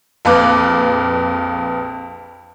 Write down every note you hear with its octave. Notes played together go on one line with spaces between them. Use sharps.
A#1 F2 B4 F5 D6 F#6